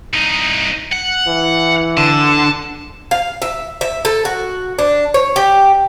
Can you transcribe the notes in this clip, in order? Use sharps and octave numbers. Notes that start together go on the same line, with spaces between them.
C2 D#4
F#5
E3
D3 A5
F5
E5
E5
A4
F#4
D4
C#5
G4